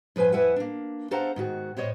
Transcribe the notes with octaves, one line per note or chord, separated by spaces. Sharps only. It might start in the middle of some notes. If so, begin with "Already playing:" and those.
G2 F3 B4 C5 G#5
F2 E4 B4 E5 F#5 G#5
A#3 D4
D4 A4 C5 F5 F#5 A#5
G#2 D#3 F#4
A2 C5 C#5 D#5